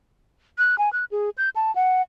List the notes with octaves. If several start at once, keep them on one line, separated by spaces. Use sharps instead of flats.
F#6
G#5
F#6
G#4
G6
A5
F#5